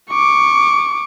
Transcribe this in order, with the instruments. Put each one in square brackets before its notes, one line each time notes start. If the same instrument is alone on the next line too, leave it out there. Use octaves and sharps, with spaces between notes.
[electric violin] C#6 D6